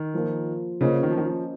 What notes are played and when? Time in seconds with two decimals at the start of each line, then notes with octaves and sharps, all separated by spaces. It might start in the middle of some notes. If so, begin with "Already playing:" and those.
Already playing: D#3
0.14 F3 A#3 F4 A#4
0.81 C#3 A#3 C#4 F4 C5 D#5
1.03 D#3
1.10 F3
1.17 D#3
1.26 F3